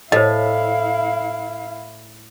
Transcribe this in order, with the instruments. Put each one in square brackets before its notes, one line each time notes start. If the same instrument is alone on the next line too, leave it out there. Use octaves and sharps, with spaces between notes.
[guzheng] A2 [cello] E4 F5 [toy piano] C5 D#5